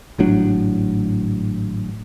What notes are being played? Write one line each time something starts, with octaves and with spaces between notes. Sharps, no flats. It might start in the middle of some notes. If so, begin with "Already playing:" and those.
G#1 A2 F#3 D4